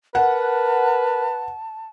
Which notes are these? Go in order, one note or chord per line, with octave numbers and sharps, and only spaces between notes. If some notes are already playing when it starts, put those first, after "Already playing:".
A#4 B4 F#5 A5